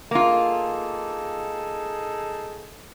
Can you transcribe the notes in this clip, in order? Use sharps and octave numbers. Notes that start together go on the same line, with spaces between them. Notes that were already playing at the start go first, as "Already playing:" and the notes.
A#3 D#4 F4 G#4 A4